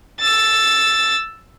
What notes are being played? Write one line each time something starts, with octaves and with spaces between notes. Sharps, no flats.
E6 A6